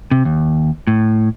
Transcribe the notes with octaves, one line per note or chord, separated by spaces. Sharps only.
C3
D#2
A2